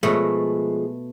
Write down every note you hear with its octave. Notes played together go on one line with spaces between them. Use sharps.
B2 F3 G#3 A3